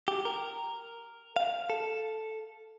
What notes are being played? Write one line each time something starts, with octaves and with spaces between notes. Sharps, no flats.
G4
A#4
F5
A4